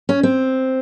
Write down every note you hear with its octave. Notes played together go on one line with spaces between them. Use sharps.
C#4
C4